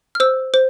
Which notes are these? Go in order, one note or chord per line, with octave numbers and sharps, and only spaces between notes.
F6
C5 E6
C5